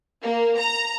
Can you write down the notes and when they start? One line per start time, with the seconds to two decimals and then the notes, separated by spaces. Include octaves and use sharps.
0.23 A#3
0.59 A#5